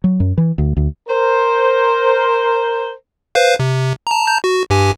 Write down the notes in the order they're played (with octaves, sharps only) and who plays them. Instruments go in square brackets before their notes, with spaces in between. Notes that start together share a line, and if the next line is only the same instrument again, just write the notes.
[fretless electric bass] F#3
F#2
E3
D2
D2
[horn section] A#4 C5
[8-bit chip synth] B4 C5 F5
C3
A5 A#5
A5 A#5 G6
F#4
G2 G4 G#5